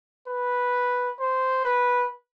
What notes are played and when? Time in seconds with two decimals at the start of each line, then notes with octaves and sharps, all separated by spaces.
0.28 B4
1.20 C5
1.65 B4